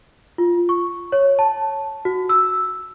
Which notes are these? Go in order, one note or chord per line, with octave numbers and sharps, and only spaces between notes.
F4
C#6
C#5
A5
F#4
E6